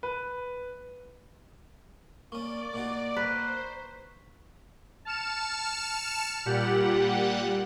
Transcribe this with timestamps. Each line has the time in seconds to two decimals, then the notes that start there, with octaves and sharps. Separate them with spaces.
0.03 B4
2.32 A#3 C#4 D5 C#6 D6
2.74 A#2 D#4 F#4
3.16 B4 C5 A#5 F#6 B6
5.05 A5 F6 C#7 E7
6.45 A#2 G3 G4 F#5